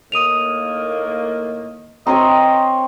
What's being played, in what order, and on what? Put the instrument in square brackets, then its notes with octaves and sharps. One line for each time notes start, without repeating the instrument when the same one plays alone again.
[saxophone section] A2 D#3 A#3 [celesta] D#6 D#7 F7
[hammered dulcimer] C4 A#4 C#5 [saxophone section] D#5 [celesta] A#5